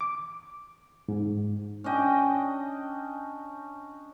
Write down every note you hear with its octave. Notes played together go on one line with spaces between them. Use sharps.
D6
G#2
C#4 D4 D#5 G5